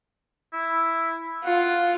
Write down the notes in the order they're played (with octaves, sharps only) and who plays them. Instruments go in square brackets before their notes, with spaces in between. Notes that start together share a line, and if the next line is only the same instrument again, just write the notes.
[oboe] E4
[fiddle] F4 [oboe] F#5